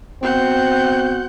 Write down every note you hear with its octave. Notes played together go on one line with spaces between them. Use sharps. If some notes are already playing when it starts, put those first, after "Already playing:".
B2 C4 F#5 G6